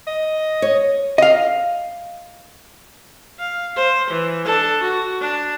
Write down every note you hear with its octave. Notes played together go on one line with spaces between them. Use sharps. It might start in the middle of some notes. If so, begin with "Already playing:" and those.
D#5
C#5
D#5 F5
F5
C5
E3
D4 A4
F#4
D4